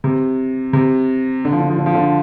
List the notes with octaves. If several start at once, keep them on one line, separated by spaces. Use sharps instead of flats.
C3
C3
D3
F3
D3
F3
D3
F3
D3